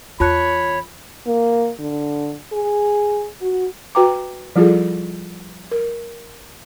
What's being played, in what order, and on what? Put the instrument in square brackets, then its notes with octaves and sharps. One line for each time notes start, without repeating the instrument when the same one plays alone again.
[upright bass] E2 [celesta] F4 A5 F#6 [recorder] C#5 [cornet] B5
[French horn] A#3
D3
G#4
F#4
[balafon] F#4 B4 G5 A#5 D6
F3 G3 E4 F4 G#4 A4
A#4